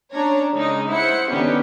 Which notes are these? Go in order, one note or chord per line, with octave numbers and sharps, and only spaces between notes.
C#4 D4 C#5 A#5
C#3 G#3 D#4
E4 C5 F#5 C#7
D3 D#3 G3 B3 C#4 G4